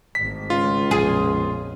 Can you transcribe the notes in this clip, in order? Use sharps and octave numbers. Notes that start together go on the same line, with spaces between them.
G#1 A2 B6
C#2 F4
A#1 F2 B2 G#4